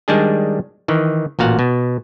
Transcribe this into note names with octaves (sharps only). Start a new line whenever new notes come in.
D#3 G3 G#3 D4 G#4
D#3 E3
A1 A#2 F#4 F5 F#5
B2